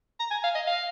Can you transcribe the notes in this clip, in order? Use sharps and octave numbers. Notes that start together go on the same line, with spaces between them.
A#5
G#5
F5
D#5
F5